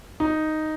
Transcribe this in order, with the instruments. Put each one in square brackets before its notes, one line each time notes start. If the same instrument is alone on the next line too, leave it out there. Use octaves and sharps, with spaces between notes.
[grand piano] D#4